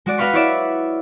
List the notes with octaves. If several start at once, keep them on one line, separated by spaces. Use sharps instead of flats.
G#3 F#4 D5
F#4 B4 D#5 F5 B5 C#6
E4 C#5 D5 E5